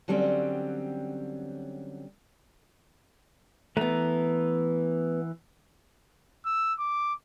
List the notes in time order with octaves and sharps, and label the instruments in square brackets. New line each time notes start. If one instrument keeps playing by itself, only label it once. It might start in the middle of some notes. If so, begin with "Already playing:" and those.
[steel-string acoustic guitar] D3 F#3 G3 C4 C#4
[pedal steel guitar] E3 B4 A#5 [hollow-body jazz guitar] A3 B3
[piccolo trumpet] E6
D6